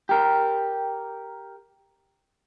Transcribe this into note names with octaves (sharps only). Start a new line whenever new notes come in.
G4 A#4